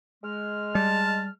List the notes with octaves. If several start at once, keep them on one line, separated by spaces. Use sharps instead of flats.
G#3 F6
G3 A5